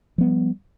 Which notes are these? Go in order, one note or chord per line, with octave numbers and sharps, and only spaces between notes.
F3 G3 B3